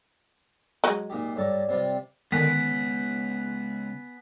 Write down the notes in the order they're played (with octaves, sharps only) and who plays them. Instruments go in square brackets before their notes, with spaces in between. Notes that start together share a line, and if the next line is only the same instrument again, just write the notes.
[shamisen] F#3 G#3
[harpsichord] A#2 D#4 G4
[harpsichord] G2 A4 A#5 [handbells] C#5 D5 D6
[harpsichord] C3 G3 F4 [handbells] D5
[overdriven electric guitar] C#2 [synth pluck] D3 D#3 [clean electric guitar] B3 [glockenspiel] G#5 F#6 B6